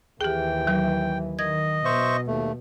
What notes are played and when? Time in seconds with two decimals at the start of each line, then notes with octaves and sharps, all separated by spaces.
0.21 D#2 E3 G4 G#4 G5
0.67 F#3
1.39 D#3 D#5 G#6
1.85 B2 C5 E5 C#6
2.27 D#2 A3